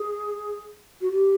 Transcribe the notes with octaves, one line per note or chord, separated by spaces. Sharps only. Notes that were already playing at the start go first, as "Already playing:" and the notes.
Already playing: G#4
F#4
G4